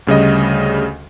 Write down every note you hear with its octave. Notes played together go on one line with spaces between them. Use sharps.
D2 C#3 G3 D#5